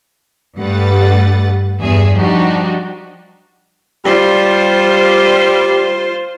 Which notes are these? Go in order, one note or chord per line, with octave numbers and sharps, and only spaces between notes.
G2 G3 A3 B4 F#5 A6
E2 G2 G#4 E5
F3 G3 D4 D#4 F#4 G4
G3 F4 C5